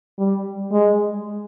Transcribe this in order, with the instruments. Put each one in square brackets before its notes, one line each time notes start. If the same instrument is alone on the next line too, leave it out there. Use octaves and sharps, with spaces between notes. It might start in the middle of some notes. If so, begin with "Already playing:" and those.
[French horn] G3
G#3